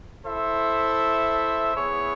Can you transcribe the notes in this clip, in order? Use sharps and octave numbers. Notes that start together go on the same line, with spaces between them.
E4 A4 C5 E5
B3 E4 G#4 C#5